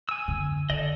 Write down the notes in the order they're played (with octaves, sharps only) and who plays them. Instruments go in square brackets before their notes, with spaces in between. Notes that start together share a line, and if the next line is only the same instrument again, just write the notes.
[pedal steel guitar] G#5 E6
[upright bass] F2 D3
[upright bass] D3 [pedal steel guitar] A4 D5 D#5